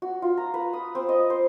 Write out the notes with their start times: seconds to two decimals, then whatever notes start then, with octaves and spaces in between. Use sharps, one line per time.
0.02 F#4
0.22 F4
0.37 A#5
0.54 B4
0.73 D#6
0.95 C4
1.09 D#5
1.30 C5